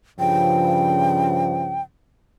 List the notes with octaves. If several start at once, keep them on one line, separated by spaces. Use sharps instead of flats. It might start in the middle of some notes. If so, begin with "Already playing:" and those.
G2 C#3 F3 G5